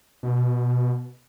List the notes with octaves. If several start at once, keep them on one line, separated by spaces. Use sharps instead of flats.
B2